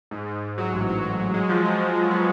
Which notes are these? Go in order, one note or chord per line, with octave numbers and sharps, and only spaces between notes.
G#2
G#2
G#2
F#3
A1
F#3
F#3
F#3
G#3
F3
G#3
F3
G#3
B3